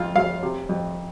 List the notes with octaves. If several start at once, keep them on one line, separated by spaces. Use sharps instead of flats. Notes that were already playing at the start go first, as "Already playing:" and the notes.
Already playing: F2 F4
F2 F5
C3
F2